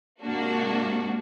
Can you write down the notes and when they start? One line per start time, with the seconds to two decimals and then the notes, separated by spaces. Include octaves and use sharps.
0.22 G#2 C3 A#3 D4 F#4